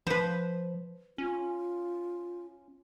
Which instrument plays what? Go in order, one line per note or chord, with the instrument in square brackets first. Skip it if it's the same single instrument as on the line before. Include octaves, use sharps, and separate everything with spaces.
[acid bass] F3 [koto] B4 C5
[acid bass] C#4 [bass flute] F4